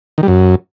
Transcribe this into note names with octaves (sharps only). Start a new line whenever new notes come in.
D#3
G3
F#2